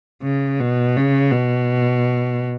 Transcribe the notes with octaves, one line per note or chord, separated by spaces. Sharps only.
C#3
B2
C#3
B2